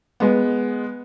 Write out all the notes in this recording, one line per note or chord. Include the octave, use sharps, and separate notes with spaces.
G#3 B3